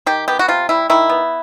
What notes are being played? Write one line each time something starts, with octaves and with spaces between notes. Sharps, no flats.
D#3 G4
B3 G4
F#4
C3 F4
G3 E4
D#3 E4
B3